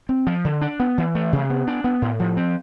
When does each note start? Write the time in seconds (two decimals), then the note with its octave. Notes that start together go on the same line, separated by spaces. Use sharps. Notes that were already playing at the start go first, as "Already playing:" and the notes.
0.09 C4
0.27 F3
0.45 D3
0.62 D4
0.80 B3
0.98 E3
1.15 A3
1.33 C3
1.50 B3
1.67 D4
1.84 B3
2.02 A2
2.20 F3
2.37 C4